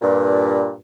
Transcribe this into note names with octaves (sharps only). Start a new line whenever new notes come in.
G2 A#2